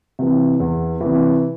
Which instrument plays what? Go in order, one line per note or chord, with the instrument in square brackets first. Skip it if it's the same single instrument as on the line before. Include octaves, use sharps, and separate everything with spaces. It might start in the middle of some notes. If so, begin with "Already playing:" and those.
[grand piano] C3 E3
E2
C3 E3